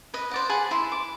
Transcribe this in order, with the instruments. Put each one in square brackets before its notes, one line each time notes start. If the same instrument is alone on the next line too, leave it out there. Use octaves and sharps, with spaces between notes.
[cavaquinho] B4 D#5
C5 D5 F#5
G#4 F#5 G#5 B5
E4 C6
D6